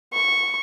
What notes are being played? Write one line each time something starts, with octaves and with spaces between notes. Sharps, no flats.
C#6